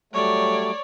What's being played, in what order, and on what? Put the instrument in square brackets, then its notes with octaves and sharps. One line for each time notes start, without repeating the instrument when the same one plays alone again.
[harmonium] F#3 G3 A3 [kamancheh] C#5 D5